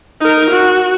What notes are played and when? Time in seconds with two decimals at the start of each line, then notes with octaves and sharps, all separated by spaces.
0.21 D#4 A#4
0.51 F#4